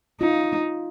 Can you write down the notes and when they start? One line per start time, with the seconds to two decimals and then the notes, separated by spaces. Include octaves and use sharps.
0.20 D#4 F4